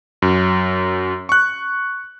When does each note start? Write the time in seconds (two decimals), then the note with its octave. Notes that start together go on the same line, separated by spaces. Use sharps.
0.22 F#2
1.29 C#6 F#6